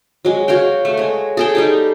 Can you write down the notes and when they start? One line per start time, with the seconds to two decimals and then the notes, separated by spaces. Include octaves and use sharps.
0.25 F#3 G#3
0.48 F#4 C#5 F5 G5
0.85 A3
0.97 G#3 C#5
1.37 G#4 A4 G5
1.55 G3 D#4 G4